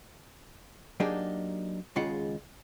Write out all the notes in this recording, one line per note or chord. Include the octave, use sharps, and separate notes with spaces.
F#3 A#3 D4 D#4 G4 G#4
D#2 C#3 G#3 F4 F#5